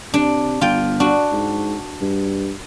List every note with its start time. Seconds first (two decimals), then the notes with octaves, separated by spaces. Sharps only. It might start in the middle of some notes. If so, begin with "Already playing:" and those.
0.14 C3 D4
0.61 G1 F4 G5
1.00 D4 F#4
1.32 G#2
2.01 G2